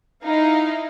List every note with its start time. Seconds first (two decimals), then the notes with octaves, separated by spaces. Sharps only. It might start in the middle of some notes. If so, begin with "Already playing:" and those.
0.24 D#4 E4 F5